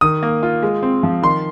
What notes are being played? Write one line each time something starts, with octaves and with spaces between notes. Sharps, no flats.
D#3 D#6
A#3
F4
G#3
C4
F3
D#3 C6